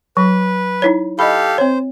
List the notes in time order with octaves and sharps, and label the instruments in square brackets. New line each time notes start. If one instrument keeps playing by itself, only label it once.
[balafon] F#3 [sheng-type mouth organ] B4
[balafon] D#4 E4 C#5
[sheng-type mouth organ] G4 A4 F5 [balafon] D#5 B5
[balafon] C4 C#5 [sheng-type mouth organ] C5